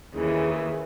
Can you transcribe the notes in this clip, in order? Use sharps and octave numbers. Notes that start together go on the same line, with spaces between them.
D#2 C#3 E3